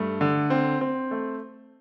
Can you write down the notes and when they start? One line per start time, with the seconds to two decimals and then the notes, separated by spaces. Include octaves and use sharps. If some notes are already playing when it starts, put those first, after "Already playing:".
Already playing: G2 A3
0.21 D3
0.50 C4
0.81 C4
1.11 A3